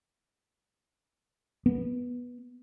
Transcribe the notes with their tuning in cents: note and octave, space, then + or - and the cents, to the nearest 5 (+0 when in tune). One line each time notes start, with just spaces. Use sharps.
B3 -10